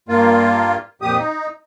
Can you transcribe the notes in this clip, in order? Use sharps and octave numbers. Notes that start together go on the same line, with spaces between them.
G2 A#3 F4
F2 A#2 G4 D#6
D#4